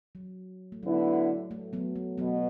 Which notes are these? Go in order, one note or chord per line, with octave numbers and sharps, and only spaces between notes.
F#3
A3
D3 F#3 B3 E4
A3
F#3 B3
A3
B2 F#3 B3